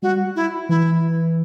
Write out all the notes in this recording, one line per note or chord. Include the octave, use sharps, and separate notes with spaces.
G3 F#4
E4
E3 E4